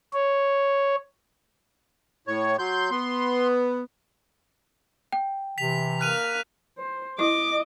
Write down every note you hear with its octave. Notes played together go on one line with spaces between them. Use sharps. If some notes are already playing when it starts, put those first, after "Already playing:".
C#5
A2 C#5
F#3 C6 G6
B3 C6
G5
C3 E3 B6 F7
A#3 F6 F#6 D#7 F7
C5
E4 D#5 D6